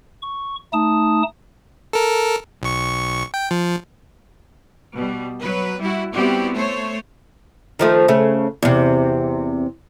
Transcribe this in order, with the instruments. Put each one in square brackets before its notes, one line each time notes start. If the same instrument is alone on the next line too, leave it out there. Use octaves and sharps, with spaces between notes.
[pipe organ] C#6
A3 D#4 A5 D#6
[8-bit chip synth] A4 A#4
B1 C#6
G5
F3
[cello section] B2 G3
F#3 B4
G3 E4 F#4
G3 B3 C4 E4 F#4 G4
A3 C5 C#5
[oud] D#3 F3 A3
C#3 A3
E2 C3